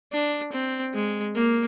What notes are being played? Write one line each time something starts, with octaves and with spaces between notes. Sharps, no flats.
D4
C4
G#3
A#3